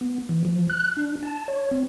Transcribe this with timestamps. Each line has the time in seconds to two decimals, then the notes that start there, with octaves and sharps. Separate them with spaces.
0.01 B3
0.29 E3
0.45 F3
0.70 F#6
0.97 D4
1.23 A5
1.48 C#5
1.71 C4